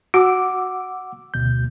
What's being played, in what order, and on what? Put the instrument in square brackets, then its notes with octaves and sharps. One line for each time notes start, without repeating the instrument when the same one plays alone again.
[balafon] F#4 [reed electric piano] F#5 D6 E6
[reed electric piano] D2 B2 G6